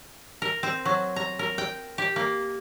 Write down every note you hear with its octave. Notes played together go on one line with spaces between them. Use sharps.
A#4
C4
F#3
A#5
A#4
G5
G4
A#3